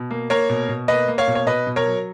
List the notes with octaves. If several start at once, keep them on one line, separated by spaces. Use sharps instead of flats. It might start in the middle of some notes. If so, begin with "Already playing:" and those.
Already playing: B2
A#3
A#3 A#4 C#5
B2
B2
A#3 B4 D#5
A#3
C#5 F5
B2
C#5
B2 B4 D#5
B2
A#4 C#5
F#3